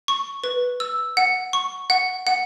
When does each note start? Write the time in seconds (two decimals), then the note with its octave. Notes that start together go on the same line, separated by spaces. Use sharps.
0.08 C#6
0.44 B4
0.80 E6
1.17 F#5
1.53 C#6
1.90 F#5
2.27 F#5